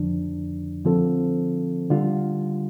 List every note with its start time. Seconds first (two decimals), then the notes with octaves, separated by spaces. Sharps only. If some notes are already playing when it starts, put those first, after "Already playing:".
Already playing: F2 D3 F3 D4
0.85 D3 F3 C4 F4 A4
1.90 D3 G3 F4